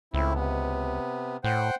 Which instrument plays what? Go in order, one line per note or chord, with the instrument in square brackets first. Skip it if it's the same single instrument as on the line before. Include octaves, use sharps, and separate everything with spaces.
[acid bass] C#2 [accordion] A2 C4 E4
[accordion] C3 B3
[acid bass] A2 [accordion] C5 F#5 G5